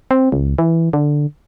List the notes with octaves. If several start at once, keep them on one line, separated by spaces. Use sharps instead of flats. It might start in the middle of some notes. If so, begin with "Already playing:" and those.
C4
C#2
E3
D3